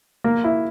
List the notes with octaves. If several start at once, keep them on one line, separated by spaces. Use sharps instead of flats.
A#3
E4